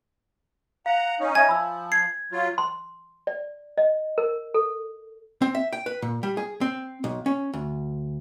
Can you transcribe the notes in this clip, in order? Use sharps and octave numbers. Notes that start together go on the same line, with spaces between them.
F5 F#5 A#5
C#4 D#4
E5 G#5 G#6
F3 B5 E6
G#6 C7
F#3 F4
C6
D5
D#5
A#4
A4
C4
E5
G5
B4
A#2
G3
G#4
C4
B1
C#4
D2